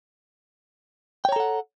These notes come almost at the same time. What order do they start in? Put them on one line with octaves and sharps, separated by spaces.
G5 C#5 A#5 A4 F#5